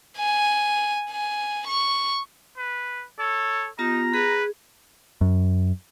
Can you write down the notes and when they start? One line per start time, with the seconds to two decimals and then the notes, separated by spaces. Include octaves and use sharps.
0.17 G#5
1.11 G#5
1.67 C#6
2.57 B4
3.19 A4 C#5
3.79 B3 D#4 F4 G4 A#5
4.14 G#4 B4
5.21 F#2